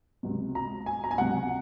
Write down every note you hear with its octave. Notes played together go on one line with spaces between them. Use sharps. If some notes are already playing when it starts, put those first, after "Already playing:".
C#2 C3 F#3
A#5
G#5
A#5
G#5
C#2 C3 F#3 F#5